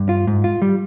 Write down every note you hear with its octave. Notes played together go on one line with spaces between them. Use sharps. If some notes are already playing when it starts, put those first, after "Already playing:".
Already playing: G2
F4
G#2
F4
G3